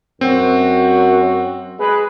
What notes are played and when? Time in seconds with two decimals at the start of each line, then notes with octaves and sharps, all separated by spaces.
0.21 F#2 C4 F#4
1.79 G#3 B4